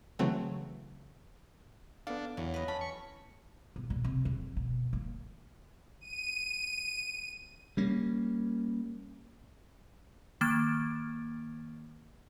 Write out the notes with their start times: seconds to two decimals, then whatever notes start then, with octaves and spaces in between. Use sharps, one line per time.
0.19 C#3 E3 F#3 A3 C4
2.07 B3 D4 A4 F5
2.37 E2 F#3
2.54 B4 D#5
2.68 C#4 A5 B5
2.81 C#6
3.76 B2
3.90 A#2
4.04 C3
4.25 F2
4.56 B2
4.93 A#3
6.01 D#7
7.77 G3 A#3 C#4
10.41 D#3 A#3 F6 A6 D7 E7